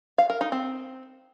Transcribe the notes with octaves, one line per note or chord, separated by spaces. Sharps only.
F5
A#4
D#4
C4